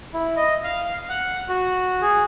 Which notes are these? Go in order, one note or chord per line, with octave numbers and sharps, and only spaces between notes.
E4
D#5
F5
F#5
F#4
G#4